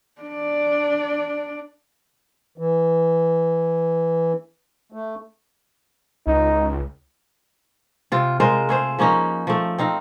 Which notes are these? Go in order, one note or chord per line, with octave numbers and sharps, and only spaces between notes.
D4 D5
E3
A3
C#2 D#4
C3 F4
G#3 F4 A#4 C5
A3 G#4 C5
F3 A#3 C#4 D#4
F3 A3
C4 D#4 F5